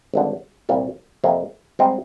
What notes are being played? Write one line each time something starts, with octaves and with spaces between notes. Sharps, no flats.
G#1 G2 D3
C2 A#2 G3
F2 C3 F3 A#3
G#2 G3 C4 D#4